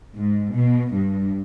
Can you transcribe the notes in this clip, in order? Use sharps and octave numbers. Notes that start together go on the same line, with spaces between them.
G#2
B2
G2